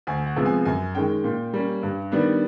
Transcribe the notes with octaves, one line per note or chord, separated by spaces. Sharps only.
D2 G#5
F#5
C3 F3 G#3 B3
G#5
F#2 G#5
D#3 G#3 C#4 G5
A#2
G3 A#3 C#4
G2
D#3 G3 B3 D4